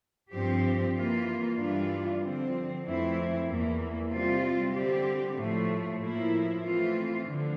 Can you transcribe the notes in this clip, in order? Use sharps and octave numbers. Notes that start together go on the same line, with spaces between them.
G2 F3 C4 G4
E3 A#3 F4
G2 E3 G3 D4 F4
D3 F3 C4
F2 E3 A3 C4 E4
E2 E3 A#3
C3 G3 C4 F4
D3 G3 C4 G4
A2 F3 A3
A2 F3 A#3 E4
E3 A3 C4 F4
D3 F3